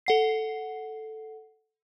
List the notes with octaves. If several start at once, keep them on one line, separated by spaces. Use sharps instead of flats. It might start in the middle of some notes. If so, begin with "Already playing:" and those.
A4 F#5 C7